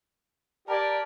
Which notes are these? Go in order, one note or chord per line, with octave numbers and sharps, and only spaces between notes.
G4 A#4 D5 A5 A#5 G#6